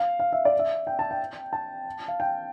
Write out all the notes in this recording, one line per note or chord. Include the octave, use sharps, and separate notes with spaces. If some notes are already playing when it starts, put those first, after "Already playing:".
Already playing: F5
F5
E5
D5
E5
G5
A5
G5
A5
F5
G5